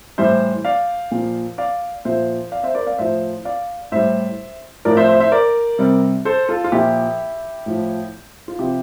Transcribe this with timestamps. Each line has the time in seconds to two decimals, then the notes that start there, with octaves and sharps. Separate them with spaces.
0.18 A2 E3 G3 C5 E5
0.64 D5 F5
1.11 A#2 F3
1.58 D5 F5
2.05 A#2 F3 C5 E5
2.52 D5 F5
2.63 C5 E5
2.75 A#4 D5
2.87 D5 F5
2.98 A2 F3 C5 E5
3.45 D5 F5
3.92 A2 G3 C5 E5
4.85 A2 F3 A#4 D5
4.97 C5 E5
5.09 C5 E5
5.20 C5 E5
5.32 A#4 D5
5.79 C3 G3
6.25 A4 C5
6.49 F4 A4
6.64 F4
6.72 A#2 F3 E4 G4
7.66 A2 F3
8.48 F4
8.59 C3 F3 E4 G4